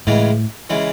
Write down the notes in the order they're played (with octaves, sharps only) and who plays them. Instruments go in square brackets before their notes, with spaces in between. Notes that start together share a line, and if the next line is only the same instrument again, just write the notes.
[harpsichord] C#2 C#3 E3 G#3 [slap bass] A2
[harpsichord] C#3 E3 G#3